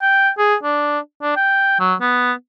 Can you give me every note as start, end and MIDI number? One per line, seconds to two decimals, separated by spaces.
0.02 0.29 79
0.38 0.55 68
0.63 0.99 62
1.22 1.34 62
1.36 1.78 79
1.79 1.95 54
2.01 2.32 59